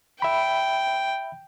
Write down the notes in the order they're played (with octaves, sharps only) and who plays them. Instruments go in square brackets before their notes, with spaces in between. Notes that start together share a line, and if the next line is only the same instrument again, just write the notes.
[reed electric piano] E5 B5 [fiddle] G5